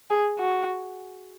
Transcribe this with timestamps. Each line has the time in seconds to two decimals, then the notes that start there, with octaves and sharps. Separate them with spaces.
0.10 G#4
0.39 F#4